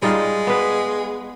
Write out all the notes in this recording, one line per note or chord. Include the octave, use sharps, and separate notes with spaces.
G3 G#3 D#4 F4
B3 B4